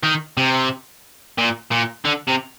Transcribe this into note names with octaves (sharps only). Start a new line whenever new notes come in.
D#3
C3
A#2
A#2
D3
C3